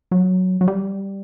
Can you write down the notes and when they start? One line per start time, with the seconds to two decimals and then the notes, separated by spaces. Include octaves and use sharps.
0.11 F#3
0.61 F#3
0.67 G3